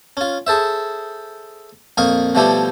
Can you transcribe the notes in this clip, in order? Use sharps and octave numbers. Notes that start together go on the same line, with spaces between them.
C#4 F4
G#4 A4 C5 E5
F2 A#2 D#5 F5 C#6
B2 F3 G3 A3 E4 G4